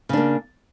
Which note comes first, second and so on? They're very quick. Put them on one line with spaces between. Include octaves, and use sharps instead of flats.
C#3 D4 A#3